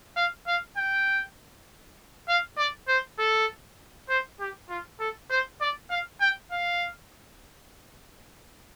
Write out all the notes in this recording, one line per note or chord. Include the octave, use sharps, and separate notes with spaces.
F5
F5
G5
F5
D5
C5
A4
C5
G4
F4
A4
C5
D5
F5
G5
F5